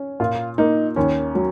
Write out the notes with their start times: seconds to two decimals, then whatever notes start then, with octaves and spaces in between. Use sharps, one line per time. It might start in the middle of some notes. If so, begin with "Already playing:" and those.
Already playing: C#4
0.20 A#2 F4
0.58 A#3 D#4
0.96 D#2 C#4
1.35 F#3